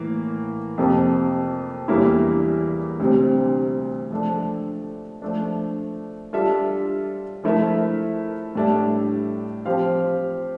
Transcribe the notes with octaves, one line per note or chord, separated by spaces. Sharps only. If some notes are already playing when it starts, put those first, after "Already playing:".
Already playing: A2 E3 A#3 E4
F2 C3 F3 A#3
E2 E3 G3 A#3 E4
D2 C3 G3 C4
F3 A3 D4 A4
F3 A3 D4
G3 D4 F4 A4 E5
F3 A3 E4 A#4 E5
A2 G3 D4 A4 E5
F3 C4 G4 C5 F5